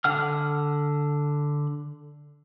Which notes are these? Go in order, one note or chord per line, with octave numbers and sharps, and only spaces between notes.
D3 F#5 F6